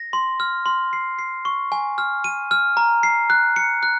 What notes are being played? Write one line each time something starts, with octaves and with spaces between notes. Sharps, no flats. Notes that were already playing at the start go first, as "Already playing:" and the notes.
Already playing: A#6
C6
F6
C6
C7
C7
C#6
G#5
F6
D#7
F6
A#5
C7
F#6
C#7
F#6